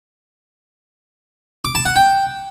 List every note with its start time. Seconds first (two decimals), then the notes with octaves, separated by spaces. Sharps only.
1.65 D6
1.75 A5
1.85 F#5
1.96 G5